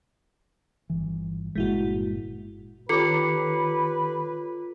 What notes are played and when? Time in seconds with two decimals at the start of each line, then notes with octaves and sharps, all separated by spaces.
0.90 G1 E3
1.55 G1 A#2 G#3 E4 F#4
2.89 D#3 F4 G4 A4 B4 C#5 D6 C#7